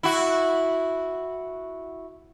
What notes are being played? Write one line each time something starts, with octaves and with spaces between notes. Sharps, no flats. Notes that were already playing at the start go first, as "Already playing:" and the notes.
E4 F#4